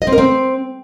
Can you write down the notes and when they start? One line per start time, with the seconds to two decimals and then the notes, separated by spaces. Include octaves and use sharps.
0.02 D#5
0.07 C4
0.12 A#4
0.18 C4